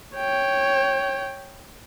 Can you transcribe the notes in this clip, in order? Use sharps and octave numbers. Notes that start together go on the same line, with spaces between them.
C#5 G5